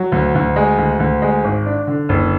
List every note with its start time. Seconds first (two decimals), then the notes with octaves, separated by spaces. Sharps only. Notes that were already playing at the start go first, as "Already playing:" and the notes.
Already playing: F#3
0.12 D2
0.35 D2
0.56 G#3
0.78 D2
1.00 D2
1.22 G#3
1.44 G#1
1.66 D4
1.87 D3
2.09 F#1